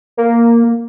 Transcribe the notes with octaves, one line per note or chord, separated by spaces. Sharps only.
A#3